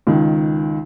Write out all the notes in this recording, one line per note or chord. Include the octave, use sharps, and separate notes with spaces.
C#2 D#3